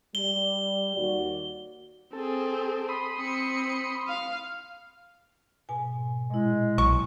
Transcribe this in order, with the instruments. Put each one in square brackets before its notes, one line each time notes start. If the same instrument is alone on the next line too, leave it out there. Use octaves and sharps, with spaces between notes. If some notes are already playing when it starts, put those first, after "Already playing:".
[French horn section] G3 [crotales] G7
[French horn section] D#2 F#4 D5
[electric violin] C4 G#4 [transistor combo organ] A4
[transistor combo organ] B5 C6 D#6
[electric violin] C4 C#7
F5
[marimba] G#2 B2 G#5
[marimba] A#2 E4 [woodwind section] G#3
[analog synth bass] B1 [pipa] C#6